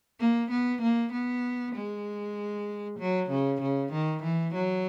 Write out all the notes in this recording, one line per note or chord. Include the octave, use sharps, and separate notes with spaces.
A#3
B3
A#3
B3
G#3
F#3
C#3
C#3
D#3
E3
F#3